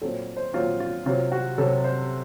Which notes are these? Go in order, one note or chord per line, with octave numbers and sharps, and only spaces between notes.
A#2 F#3 C4 A4
C5
A#2 F#3 C4 F4
F4
C3 F#3 C4 F4
F#4
C3 F#3 C4 A4
C5